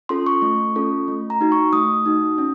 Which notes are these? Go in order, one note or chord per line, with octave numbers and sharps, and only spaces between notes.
C#4 F4 A4 C6
C#6
A3
C#4 F4 A4
A3
A#5
D#4 F#4
C#6
A3 D#6
D#4 F#4
C#4